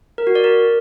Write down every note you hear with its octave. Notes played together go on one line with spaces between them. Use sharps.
A#4
F#4
D5
A#4